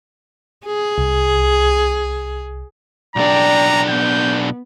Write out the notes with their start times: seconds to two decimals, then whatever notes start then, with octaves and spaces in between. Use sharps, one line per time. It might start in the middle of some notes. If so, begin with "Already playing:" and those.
0.66 G#4
0.98 C2
3.16 B1 D4 D5 G5 A#5
3.89 B3 G6